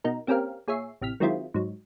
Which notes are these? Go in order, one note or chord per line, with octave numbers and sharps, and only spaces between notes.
B2 D#4 A#4
A#3 C4 C#4 G4 A#4 F5
A#2 G#4 C#5 E5 C7
A1 C3 F6 B6
D#3 F#3 G#3 C4 E4 F4
G#2 F#3